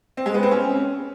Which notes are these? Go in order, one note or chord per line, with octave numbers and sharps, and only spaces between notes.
C4
G#3
B3
C4
C#4